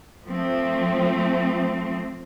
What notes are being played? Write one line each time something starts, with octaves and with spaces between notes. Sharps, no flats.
F3 A3 C4